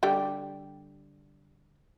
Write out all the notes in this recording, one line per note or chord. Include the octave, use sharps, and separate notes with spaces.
D3 G3 G4